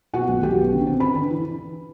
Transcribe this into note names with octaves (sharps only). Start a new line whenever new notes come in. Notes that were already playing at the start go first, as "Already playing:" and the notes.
B2 F#4 F#5
B1
B1 G4 G5
B2
D3
C4
D3 B4 B5
D3
E3